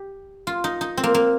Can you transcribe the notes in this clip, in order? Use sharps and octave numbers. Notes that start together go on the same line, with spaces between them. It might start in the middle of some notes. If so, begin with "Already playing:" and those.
Already playing: G4
F4
D#4
D#4
C4
A#3
A#3